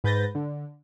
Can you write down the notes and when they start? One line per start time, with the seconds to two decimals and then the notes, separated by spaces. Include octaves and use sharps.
0.04 G#2 B4 G6 A6 A#6
0.35 D3